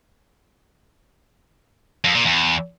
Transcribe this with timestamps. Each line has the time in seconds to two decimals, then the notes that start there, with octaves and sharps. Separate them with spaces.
2.04 F2
2.15 A#2
2.25 E2